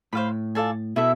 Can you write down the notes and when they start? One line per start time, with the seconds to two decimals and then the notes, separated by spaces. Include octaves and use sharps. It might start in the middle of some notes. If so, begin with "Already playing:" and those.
0.13 A2 C5 F5 B5
0.55 F4 A4 D5 G#5
0.96 B2 E4 A4 E5